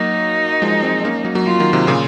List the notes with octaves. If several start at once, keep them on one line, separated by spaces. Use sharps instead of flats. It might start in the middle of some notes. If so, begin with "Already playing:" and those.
Already playing: F#3 A#3 D#4
F3 G#3
G#3 C4
A#3 C#4
F#3 A#3
F#3 A#3
F4
D#3 F#3
C3 D#3
A#2 C#3